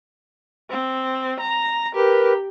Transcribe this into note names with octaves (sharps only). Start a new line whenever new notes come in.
C4
A#5
G4 A#4 B4